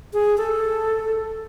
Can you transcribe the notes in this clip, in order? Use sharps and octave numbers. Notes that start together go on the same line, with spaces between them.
G#4
A4